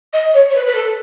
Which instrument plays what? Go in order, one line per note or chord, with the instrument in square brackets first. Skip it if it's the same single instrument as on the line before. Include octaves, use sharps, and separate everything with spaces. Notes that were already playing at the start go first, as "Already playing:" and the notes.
[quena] D#5
C#5
C#5
B4
B4
A4